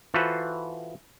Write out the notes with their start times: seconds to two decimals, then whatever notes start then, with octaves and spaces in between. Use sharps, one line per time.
0.14 E3 F4 F#4 A4 B4 C5